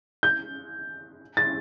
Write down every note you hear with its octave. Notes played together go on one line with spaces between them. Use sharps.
G6
A6